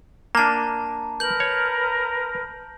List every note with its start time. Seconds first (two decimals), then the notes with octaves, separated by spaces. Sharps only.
0.35 A#3 D4 A5 A#5
1.20 A#4 B4 G6 F#7
1.40 C#5